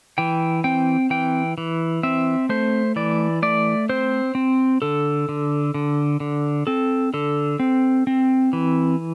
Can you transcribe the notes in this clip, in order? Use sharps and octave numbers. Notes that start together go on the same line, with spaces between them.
E3 G5
C4 G5
E3 G5
E3
C4 E5
A3 C5
E3 D5
A3 D5
C4 C5
C4
D3 A4
D3
D3
D3
C4 A4
D3 A4
C4
C4
E3